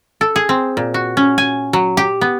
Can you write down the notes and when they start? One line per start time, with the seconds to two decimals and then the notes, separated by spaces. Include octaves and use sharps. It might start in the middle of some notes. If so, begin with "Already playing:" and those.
0.21 A4
0.36 G#4
0.49 C4
0.77 A#2
0.94 F#4
1.17 C#4
1.38 G#5
1.73 F#3
1.97 G4
2.21 B3